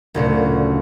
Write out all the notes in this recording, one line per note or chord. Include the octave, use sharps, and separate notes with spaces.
F#1 D2 A#2 F#4